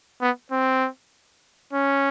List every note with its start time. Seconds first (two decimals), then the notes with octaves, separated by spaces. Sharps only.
0.22 B3
0.52 C4
1.73 C#4